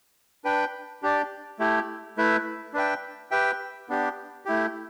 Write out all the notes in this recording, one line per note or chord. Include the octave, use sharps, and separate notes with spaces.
D4 B4 G5
D4 G4 D5
A3 E4 G4
A3 E4 B4 E5
D4 B4 E5 G5
G4 B4 E5 G5
B3 D4 G4
A3 E4 G4